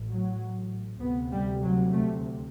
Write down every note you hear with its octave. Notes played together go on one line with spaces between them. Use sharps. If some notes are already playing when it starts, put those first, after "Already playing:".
Already playing: A1 A2
F#3
D2 C3 B3
G3
F#3
A3